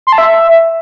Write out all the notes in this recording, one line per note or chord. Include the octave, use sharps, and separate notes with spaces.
C6
A5
E5